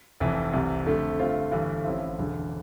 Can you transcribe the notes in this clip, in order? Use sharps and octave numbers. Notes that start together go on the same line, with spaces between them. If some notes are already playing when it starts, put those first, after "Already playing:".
F1 F2 E3
C2 C3 E3
F2 D3 A3
G2 D3 A3 C4 F4
G1 G2 E3 A3 E4
A1 A2 F3 C4 E4
E1 E2 D3